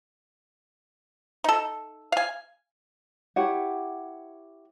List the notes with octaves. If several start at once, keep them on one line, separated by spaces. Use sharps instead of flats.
D#4 A4
F5 G#5
E4 G4 C#5 F#5